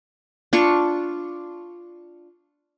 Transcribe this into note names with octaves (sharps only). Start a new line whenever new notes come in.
D4 F4 C#6